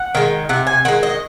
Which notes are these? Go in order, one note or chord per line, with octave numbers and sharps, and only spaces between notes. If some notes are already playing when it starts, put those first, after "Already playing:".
Already playing: F#5
D#3 G#3
C3 F#5
G#5
D#3 G#3 F#5
D#5